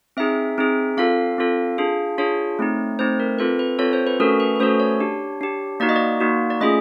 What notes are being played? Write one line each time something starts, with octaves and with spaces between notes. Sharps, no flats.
C4 D#4 G#4 E5
C4 D#4 G#4
C4 F4 A4 F5
C4 F4 A4
D4 F4 G#4
D4 F4 G#4 C#5
A3 C4 D#4
A3 C4 D#4 C5
A#4
C4 F4 A4 B4
B4
C4 F4 A4 C#5
C5
B4
A3 C#4 F#4 A4 A#4
B4
B4
A3 C#4 F#4 A4 C5
C#5
D4 G4
D4 G4
A#3 D#4 F#4 D5
D#5
D5
A#3 D#4 F#4
D5
A3 C#4 F4 G#4 D#5